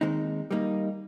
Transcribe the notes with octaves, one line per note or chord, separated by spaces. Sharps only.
D#2 D#3 G#3 C4 D#4
G3 A#3 D#4